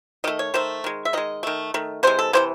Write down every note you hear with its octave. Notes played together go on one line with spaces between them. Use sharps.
D#3 A3 D#5
C#5
D#3 A3 C5
D#3 G#3
E5
D#3 G#3 D#5
D#3 A3
D#3 A3
C3 E3 G#3 C5
A4
C3 E3 G#3 C5